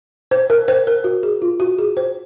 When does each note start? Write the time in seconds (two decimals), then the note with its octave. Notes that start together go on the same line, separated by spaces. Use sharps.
0.31 C5
0.50 A#4
0.68 C5
0.87 A#4
1.04 F#4
1.23 G#4
1.42 F4
1.60 F#4
1.79 G#4
1.97 C5